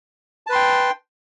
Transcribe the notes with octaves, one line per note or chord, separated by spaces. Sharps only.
B4 G5 A5 C6